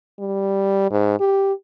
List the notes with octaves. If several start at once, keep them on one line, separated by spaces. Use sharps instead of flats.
G3
G#2
G4